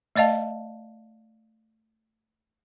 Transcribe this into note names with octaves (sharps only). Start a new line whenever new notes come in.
A3 D5 D#5 F5 A5